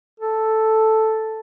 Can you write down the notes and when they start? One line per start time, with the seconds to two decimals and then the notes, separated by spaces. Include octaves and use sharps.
0.20 A4